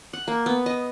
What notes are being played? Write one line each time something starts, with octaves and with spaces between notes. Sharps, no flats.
F#5
A#3
B3
D#5